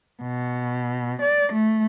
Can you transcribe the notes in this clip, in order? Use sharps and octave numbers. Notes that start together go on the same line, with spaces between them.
B2
D5
A3